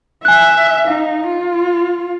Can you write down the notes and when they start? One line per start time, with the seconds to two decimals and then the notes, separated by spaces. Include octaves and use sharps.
0.25 E5 G#5 F#6
0.88 D#4 F5
1.27 F4